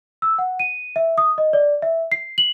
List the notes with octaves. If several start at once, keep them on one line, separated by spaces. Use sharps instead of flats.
E6
F#5
D#7
E5
D#6
D#5
D5
E5
C7
F#7